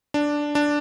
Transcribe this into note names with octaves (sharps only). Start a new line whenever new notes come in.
D4
D4